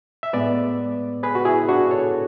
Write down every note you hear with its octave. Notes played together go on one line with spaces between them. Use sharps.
E5
A2 G#3 B3 B4 D5
G#4 B4
F#4
E4 G#4
D4 F#4
A4 C#5